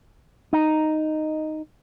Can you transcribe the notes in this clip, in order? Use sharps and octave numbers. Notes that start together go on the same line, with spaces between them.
D#4